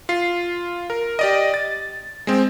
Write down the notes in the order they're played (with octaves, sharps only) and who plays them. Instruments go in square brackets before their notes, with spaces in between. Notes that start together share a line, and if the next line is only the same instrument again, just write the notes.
[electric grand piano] F4 C7
A#4
G4 D5 D#5
A6
G#3 C4